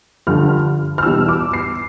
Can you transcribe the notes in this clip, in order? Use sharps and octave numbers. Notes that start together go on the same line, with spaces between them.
G2 D3 F3 F6
F6
E2 B2 G3 E6
D6
C7